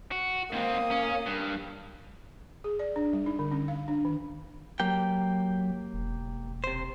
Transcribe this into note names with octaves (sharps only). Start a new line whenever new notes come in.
F#4
G#2 A#3 C4 D#6
C#4
G2
G#4
D5
D4
G3
D#4
D3
C#4
F5
D4
D#3
F#3 A#3 G4 G5
E1
C3 C5